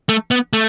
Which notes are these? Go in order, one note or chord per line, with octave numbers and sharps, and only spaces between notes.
A3
B3
A3